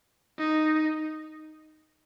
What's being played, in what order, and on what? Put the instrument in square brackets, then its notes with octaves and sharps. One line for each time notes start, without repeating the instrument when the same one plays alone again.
[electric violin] D#4